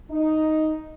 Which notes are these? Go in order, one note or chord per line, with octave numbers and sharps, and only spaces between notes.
D#4